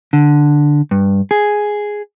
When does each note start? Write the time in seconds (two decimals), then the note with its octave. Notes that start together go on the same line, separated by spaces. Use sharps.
0.13 D3
0.91 G2
1.31 G#4